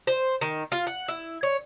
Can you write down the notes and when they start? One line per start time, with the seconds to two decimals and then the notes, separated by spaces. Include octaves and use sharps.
0.07 C5
0.41 D#3
0.72 F4
0.87 F#5
1.08 E4
1.43 C#5